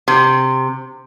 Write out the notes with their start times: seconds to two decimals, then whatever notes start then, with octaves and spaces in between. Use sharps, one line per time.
0.08 C3